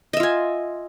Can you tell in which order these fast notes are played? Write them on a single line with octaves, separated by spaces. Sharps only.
D#5 E5 F4 G#5